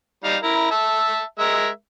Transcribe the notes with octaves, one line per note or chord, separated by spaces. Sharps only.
G3 D#4 F5
E4 A#4
E5 A5
G#3 A#4 E5